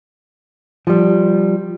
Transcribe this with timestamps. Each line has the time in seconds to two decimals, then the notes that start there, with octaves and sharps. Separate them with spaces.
0.87 F3 G3